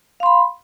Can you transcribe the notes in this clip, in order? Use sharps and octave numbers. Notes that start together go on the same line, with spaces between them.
F5 B5 C6